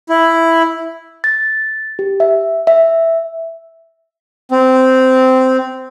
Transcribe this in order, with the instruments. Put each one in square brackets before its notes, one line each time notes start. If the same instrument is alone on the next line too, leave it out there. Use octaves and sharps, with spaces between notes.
[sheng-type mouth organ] E4
[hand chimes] A6
G4
E5
E5
[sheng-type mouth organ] C4